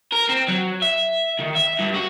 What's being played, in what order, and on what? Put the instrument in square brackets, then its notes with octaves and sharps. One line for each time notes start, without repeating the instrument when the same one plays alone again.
[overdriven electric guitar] A#4
C4
F#3
E5
D#3
E5
G2
F#4